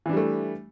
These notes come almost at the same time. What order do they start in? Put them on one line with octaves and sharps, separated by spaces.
E3 D4 G3 A3